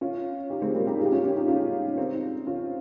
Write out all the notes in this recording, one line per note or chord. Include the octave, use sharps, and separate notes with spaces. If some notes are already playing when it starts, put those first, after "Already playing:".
C#4 F4
D#4 G4
G#3 C4
G3 A#3
D#4 G4
F4 G#4
G4
C#4 F4
C#4 F4
D#4 G4
C#4 F4
C4 D#4
C#4 F4